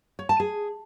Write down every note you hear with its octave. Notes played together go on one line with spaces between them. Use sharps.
C#5
A5
G#4